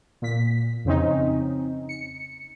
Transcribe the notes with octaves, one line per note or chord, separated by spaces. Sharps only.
A#2 B6
F2 C#3 C4 C#4 D#4
C#7